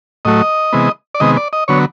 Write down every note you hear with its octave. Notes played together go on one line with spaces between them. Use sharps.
A2 F#3 A3 D#5
C3 E3 G#3 B3
D5
C3 D#3 G#3 B3 D#5
D5
D#5
D3 F#3 B3 C#5